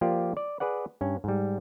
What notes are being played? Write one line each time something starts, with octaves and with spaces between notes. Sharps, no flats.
F3 A#3 F4 G4 D5
D5
G#4 B4 D5 F#5
G2 C#4
G#2 G3